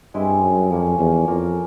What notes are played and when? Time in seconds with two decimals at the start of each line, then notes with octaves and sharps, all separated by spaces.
0.14 G2 G#3 C4 E4 G4
0.42 F#2
0.71 F2 F3 A#3 C#4
0.99 E2
1.28 F2 A#3 C#4 F4 A#4